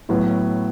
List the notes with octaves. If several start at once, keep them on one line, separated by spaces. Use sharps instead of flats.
A2 F#3 B3